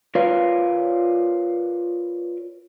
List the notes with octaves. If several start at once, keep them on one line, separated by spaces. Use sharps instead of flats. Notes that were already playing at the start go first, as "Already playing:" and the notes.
F4 A#4 B4 C#5 D5 F5